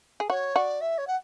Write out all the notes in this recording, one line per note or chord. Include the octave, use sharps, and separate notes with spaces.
G#4
F#4 C#5
F#4 D5
E5
C#5
F#5